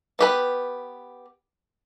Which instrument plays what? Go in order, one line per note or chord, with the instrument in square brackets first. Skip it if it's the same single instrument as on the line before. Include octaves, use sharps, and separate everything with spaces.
[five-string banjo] B3 G4 B4